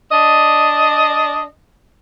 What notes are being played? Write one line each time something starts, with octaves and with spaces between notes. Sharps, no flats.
D4 D5 D#5